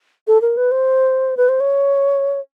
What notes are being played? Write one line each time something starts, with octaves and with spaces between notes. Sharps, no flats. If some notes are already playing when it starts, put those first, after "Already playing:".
A4
A#4
B4
C5
B4
C5
C#5